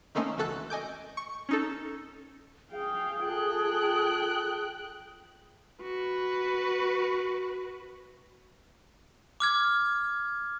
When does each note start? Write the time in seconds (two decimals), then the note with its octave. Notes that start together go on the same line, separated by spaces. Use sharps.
0.15 D#3 A3 A#3 C4 C#4 D#4
0.37 C#2 E3 F#4 A4 F#6
0.70 D#5 G#5 D6 G6
1.17 C#6
1.49 C#4 D#4 A4
2.72 G#4 F5 G5
3.24 F4 A4 G5 F#6
5.82 F#4 B4
9.40 D6 F6 G#6